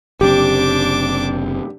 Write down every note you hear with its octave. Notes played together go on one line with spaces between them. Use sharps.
F#1 C3 D4 G4 D6